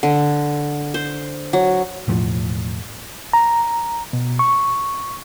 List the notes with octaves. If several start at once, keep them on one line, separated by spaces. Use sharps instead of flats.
D3
C5
F#3
E1 A2 F3
A#5
B2
C#6